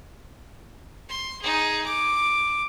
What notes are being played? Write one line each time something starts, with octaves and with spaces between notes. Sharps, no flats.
C6
D#4 G#4
D6